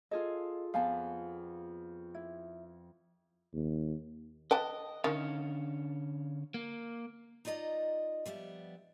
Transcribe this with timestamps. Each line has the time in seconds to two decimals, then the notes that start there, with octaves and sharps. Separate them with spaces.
0.11 F4 G#4 A4 D#5
0.74 F2 B3 F5 G#5 A5
2.15 E4
3.53 D#2
4.51 B4 D#5 G5 A5
5.04 D3 D#3 C#4 F5
6.54 A#3
7.45 D#4 F4 D5 D#5 A#5
8.26 F3 G3 B3 E5